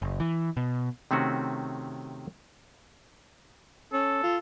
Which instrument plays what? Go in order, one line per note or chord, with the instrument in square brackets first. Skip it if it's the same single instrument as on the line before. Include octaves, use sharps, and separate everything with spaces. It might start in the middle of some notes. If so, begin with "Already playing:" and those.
[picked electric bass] F#1
E3
B2
[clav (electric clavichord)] C3 D#3 A3 C4 C#4 F#4
[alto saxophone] C#4 [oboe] A4
[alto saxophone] F4